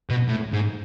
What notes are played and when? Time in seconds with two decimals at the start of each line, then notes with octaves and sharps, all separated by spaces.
0.10 B2
0.28 A2
0.52 G#2